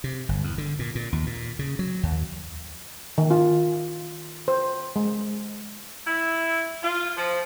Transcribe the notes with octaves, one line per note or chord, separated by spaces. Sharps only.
C3
G1
E2
D3
A#2
A#2
D#2
A#2
C#3
F#3
D#2
D#3
F4
C5
G#3
E4
F4
F3